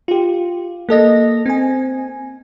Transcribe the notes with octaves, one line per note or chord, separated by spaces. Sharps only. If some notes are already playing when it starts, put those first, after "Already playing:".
F4 G4
A#3 A4 D#5 A#6
C4 G#5